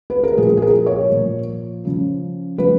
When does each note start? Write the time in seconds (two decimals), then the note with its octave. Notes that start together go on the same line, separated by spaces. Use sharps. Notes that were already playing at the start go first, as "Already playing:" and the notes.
0.10 B4
0.23 A#4
0.37 A#2 F3 G#4
0.57 G#4
0.62 A#4
0.86 C#5
1.11 A#2 F3
1.85 C#3 F3
2.58 C#3 F3 B4